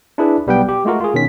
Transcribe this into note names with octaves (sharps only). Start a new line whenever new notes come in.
D4 E4 G#4 B4
B1 G3 B3 B4 G5
G4
G#3 A3 F4 F#4 A#4
F4 G#4
B2 D#3 C#4 B6